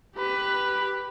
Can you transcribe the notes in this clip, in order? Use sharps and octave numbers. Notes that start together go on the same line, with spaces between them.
G4 B4